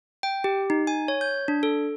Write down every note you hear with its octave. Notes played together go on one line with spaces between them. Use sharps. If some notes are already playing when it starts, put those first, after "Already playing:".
G5
G4
D#4
G#5
C#5
G6
D4
A4